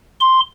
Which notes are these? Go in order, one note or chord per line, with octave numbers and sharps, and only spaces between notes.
C6